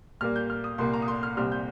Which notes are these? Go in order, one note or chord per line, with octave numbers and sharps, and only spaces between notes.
A#2 G3 A#3 F6
G6
F6
D#6
C2 A#2 A#3 C6
A#5
D#6
C6
F6
C2 A#2 G3 C4 F6
G6